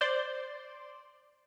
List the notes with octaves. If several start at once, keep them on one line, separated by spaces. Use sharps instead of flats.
C5 D5 C6